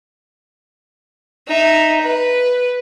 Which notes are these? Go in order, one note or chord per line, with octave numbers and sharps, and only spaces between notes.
D#4 E5
B4